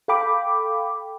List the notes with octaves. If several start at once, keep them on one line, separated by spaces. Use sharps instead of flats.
A4 F5 G5 B5 D6